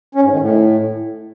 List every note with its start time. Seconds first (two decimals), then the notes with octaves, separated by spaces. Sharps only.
0.15 C#4
0.23 G#2
0.32 D#3
0.40 A2